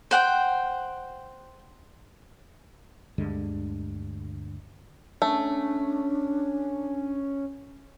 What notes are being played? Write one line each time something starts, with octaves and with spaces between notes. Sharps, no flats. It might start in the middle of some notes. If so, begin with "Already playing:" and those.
C5 F#5 G5
D2 G2 D3 G#3
A3 C#4 D4